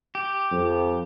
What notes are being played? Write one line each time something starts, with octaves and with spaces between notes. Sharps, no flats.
G4
F2